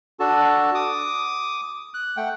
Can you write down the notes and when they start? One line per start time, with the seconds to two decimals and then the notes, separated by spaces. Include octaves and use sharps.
0.20 D4 F#4 A4 A5
0.75 D6 D#6
1.94 F#6
2.17 A3 F#5 G5